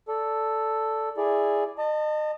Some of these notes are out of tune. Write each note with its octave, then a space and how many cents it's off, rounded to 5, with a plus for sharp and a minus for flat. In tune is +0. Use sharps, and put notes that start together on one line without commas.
A4 +0 D5 -15
E4 +0 G#4 -5 D5 +0
D#5 -30 A5 +30